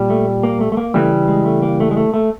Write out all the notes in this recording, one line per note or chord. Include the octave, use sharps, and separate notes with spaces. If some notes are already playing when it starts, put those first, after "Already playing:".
Already playing: A#2 G3
A3
A#3
A3
A3
A#3
C#3 E3 G3 A3
G#3
A3
A#3
A3
G#3
A3
A3